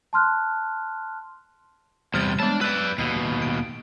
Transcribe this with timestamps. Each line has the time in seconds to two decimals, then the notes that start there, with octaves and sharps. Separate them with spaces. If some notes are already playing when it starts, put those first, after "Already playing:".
0.13 A5 C6 F6 F#6
2.14 E2 C3 G3 F6 A6
2.40 G#3 B3 D4 A5
2.61 B4 D5 B5 E6
2.98 D#2 B2 C7
3.42 D7